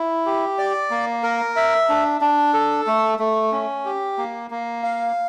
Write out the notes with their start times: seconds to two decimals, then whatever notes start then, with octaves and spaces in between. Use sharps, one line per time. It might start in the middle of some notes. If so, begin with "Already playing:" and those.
Already playing: E4
0.26 G4
0.58 D5
0.90 A#3
1.23 A#4
1.56 E5
1.89 D4
2.21 D4
2.54 A4
2.87 A3
3.19 A3
3.52 C#4
3.85 G4
4.18 A#3
4.51 A#3
4.83 F5